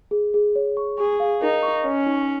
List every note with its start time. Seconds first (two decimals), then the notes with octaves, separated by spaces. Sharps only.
0.11 G#4
0.34 G#4
0.56 C#5
0.77 C#6
0.98 G#4 C#6
1.20 F5
1.41 D#4 A#4
1.63 C#6
1.85 C#4 C#5
2.06 D#4